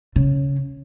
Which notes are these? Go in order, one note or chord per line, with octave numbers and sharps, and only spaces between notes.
C#3